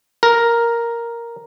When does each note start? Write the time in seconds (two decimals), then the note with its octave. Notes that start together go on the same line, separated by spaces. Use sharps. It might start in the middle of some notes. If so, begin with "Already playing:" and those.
0.23 A#4